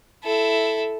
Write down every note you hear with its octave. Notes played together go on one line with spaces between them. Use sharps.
E4 A4